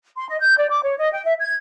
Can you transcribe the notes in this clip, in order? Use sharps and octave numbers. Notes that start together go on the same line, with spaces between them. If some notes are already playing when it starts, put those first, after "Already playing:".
C6
D#5
G6
D5
D6
C#5
D#5
G5
E5
G#6